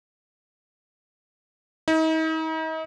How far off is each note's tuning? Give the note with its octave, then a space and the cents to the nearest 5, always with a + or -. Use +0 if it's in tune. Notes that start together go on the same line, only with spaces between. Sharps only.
D#4 +40